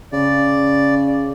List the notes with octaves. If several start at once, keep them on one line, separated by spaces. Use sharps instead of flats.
C#3 D5